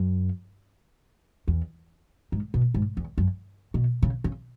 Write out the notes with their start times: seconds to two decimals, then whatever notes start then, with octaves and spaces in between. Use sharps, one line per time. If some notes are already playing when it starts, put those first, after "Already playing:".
Already playing: F#2
1.48 E2
2.32 G#2
2.54 B2
2.74 G#2
2.97 E2
3.18 F#2
3.74 B2
4.02 C#3
4.24 C#3